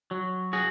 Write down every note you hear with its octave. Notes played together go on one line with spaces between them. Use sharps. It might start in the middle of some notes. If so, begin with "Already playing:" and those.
F#3
F#4 G#4